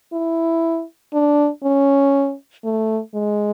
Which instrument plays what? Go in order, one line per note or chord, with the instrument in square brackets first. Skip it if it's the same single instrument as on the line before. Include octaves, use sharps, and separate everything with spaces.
[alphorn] E4
D4
C#4
A3
G#3